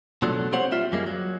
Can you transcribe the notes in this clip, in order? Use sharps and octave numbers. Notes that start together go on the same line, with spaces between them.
B2 F3 F#3 A3 D4
A#3 C4 G4 C5 C#5 F#5
G3 F4 E5
F#2 G3 G#3 A#3
F#3